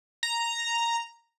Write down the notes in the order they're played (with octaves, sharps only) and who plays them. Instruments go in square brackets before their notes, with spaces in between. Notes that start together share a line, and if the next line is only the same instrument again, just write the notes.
[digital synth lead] A#5